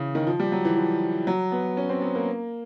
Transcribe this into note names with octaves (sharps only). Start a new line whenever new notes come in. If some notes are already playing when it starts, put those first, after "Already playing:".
Already playing: C#3 E3
D#3
F3
G3
F#3
E3
F3
F#3
B3
C#4
C4
B3
A#3